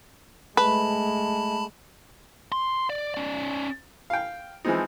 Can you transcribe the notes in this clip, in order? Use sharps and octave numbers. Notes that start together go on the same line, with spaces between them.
G#3 A3 B4 A5 B5
C6
D5
C#4 D5
F5 G5
E3 F3 G#3 C4 D#4